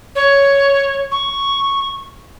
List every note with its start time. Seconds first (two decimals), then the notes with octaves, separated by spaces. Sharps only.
0.15 C#5
1.11 C#6